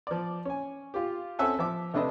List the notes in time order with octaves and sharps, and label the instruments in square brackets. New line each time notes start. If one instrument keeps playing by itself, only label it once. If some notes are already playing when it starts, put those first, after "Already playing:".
[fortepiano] F3 D5
C#4 G#5
F4 G4
C4 C#4 A4 E5 F#5 G#5
F3 E5 D6
C3 A3 D4 B4 D#5